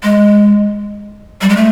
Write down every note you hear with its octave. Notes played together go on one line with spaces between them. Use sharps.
G#3
G3
G#3
A3